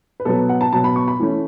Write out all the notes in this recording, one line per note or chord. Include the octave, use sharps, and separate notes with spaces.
B4
B2 F#3 B3 A4
F#5
A5
B2 F#3 B3 A5
B5
C#6
B5
E3 A3 C#4